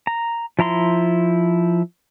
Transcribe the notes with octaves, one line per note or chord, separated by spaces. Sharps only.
A#5
F3 E4 A#5 C6